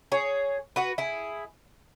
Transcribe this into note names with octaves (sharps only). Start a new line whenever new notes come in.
G#4 C#5
F#4 B4
E4 G#4